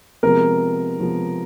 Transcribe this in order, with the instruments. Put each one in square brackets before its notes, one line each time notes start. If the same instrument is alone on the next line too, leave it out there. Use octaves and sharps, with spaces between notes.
[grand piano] C3 F3 G#3 B3 [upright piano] A#4
[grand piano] C3 F3 G#3 B3